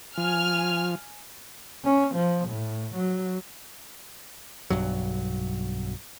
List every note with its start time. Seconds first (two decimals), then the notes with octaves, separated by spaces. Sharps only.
0.18 F3 G#5 F6
1.85 C#4
2.15 F3
2.49 A2
2.95 F#3
4.70 B1 G2 F#3